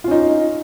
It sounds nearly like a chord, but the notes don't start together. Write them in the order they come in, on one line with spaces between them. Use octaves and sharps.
F4 C#4 D#4